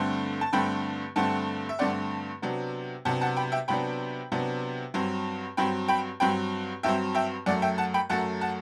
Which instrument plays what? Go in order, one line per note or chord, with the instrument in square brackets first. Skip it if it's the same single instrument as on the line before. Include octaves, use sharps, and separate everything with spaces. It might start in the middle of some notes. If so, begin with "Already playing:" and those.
Already playing: [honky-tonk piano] G2 D3 A3 C4
A5
G2 D3 A3 C4 G5 B5
G2 D3 A3 C4 F#5 A5
E5
G2 D3 A3 C4 D5 F#5
C3 F#3 B3 D4
C3 F#3 B3 D4 F#5 A5
F#5 A5
G5 B5
E5 G5
C3 F#3 B3 D4 G5 B5
C3 F#3 B3 D4
G2 F#3 C4
G2 F#3 C4 G5 B5
G5 B5
G2 F#3 C4 G5 B5
G2 F#3 C4 E5 G5
E5 G5
F#2 F#3 A3 D5 F#5
E5 G5
F#5 A5
G5 B5
F#2 F#3 A3 F#5 A5
F#5 A5